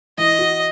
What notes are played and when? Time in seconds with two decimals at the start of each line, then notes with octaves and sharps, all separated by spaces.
0.18 E3 D#5
0.39 F#4